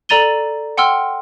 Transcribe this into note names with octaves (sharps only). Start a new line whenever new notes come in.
A4 D5 A#5 A6 D#7 G7
F#5 G5 C6 E6 F6